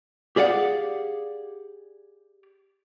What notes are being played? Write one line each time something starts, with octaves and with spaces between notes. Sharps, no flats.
G4 G#4 D5 F5 F#5